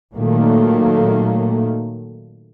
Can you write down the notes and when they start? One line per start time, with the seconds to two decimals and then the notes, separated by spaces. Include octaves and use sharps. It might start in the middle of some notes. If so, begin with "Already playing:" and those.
0.16 A#2 D#3 F#3 A3 A#3